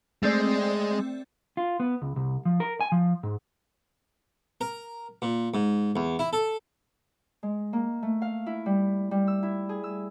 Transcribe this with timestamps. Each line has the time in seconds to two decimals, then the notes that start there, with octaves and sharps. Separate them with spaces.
0.23 G#3 A3 C4 D5
1.57 F4
1.80 B3
2.02 C#2
2.16 C2
2.45 F3
2.60 A#4
2.81 G#5
2.92 F3
3.23 G#2
4.61 A#4
5.22 A#2
5.54 G#2
5.96 E2
6.19 E4
6.33 A4
7.43 G#3
7.73 A#3
8.03 A3
8.22 F5
8.46 E4
8.66 G3
9.11 G3
9.27 E6
9.43 E4
9.69 G#4
9.84 E6